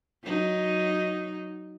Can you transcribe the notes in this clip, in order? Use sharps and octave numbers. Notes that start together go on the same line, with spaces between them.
F#3 D#4